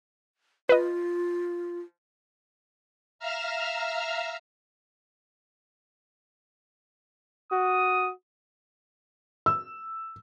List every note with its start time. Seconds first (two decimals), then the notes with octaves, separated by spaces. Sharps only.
0.69 F4 B4 D#5
3.19 E5 F5 A#5 E6 F6
7.52 F#4 D#6
9.46 E6